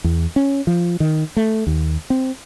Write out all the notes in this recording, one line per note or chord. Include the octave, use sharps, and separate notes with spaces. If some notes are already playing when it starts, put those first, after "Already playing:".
E2
C#4
F3
D#3
A3
D#2
C4